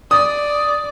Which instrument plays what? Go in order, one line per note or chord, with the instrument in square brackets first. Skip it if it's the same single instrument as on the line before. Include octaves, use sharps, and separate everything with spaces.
[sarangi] D5 [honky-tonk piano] D#6